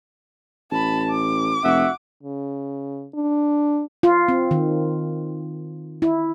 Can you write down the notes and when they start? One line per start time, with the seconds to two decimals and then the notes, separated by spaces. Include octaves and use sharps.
0.72 A1 A5 B5
1.11 D6
1.64 F1 F#4 E5 F#5
2.23 C#3
3.14 D4
4.03 F4
4.28 C4
4.51 D#3
6.02 E4